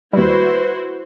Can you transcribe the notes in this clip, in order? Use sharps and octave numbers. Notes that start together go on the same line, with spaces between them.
D#2 G3 E4 F#4 B4 C5